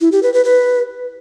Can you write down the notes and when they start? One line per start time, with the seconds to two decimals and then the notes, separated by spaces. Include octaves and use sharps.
0.01 E4
0.12 G4
0.23 B4
0.34 B4
0.45 B4